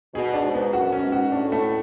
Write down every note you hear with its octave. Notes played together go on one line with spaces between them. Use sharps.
B2 G#4
D4
G#2
B3
F#2 F#4
C#4
G#2
F#4
A2 D4
A3